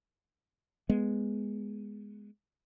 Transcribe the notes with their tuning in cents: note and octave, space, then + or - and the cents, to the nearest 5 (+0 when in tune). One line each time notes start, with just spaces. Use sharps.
G#3 +0 B3 +0